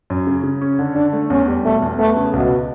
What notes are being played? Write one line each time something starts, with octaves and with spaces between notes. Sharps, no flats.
F#2
C#3
C#3
C#4
D3
D3 D4
A3
E2 C#4
G3
B2 A3
E2
A3 B3
C#3
C#2 B2